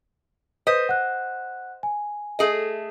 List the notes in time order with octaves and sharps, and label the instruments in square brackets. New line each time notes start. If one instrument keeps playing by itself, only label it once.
[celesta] B4 D#6 B6 [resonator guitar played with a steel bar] C5 D#5
[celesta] F#5 F#6
G#5
[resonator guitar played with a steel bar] A3 G#4 D#5